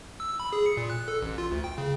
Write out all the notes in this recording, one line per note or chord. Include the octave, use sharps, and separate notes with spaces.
E6
B5
G#4
C#7
A#2
F#6
A4
A1
F4
D2
G5
C#3